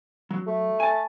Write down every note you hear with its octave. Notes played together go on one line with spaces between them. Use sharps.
F#3
A3
G#5 A5